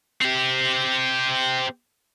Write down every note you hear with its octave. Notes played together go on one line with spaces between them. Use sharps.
C4 G4